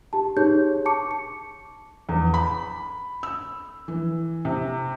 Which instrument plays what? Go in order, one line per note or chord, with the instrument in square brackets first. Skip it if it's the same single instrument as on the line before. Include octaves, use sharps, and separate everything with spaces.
[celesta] G4 A5
D#4 G4 G#4 C#5 G6
A5 C#6 D6 C#7
C#7
[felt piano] E2
B5
E6
E3
C3